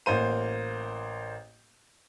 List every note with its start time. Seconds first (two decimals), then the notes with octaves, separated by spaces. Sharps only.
0.06 A1 A#3 C5 D#7